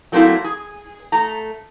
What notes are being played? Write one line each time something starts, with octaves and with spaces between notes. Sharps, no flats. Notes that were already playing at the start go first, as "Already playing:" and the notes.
F#3 A3 A#3 C4 E4 F5
G#4
A3 A#5